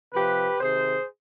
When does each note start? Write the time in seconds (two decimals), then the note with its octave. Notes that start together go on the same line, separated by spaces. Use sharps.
0.13 C3 F3 G4 B4
0.60 C3 D#3 G#4 C5